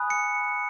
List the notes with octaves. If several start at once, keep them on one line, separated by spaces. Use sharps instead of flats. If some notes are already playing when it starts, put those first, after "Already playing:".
Already playing: G#5 B5 D#6 F#6
C#7